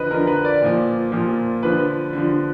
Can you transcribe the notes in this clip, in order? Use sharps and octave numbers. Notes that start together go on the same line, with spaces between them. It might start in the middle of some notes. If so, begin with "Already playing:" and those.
Already playing: D3 F3 B4 D#5
D3 F3 A#4
B4
D5
A#2 F3
A#2 F3
D3 F3 B4
D3 F3